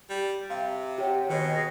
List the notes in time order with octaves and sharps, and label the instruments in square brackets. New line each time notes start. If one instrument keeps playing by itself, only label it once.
[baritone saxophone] G3
[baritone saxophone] C3 [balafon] F5
[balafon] G4 C#5 [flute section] F#5 G5
[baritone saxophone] B2 [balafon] D#3 [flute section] G#4 D#5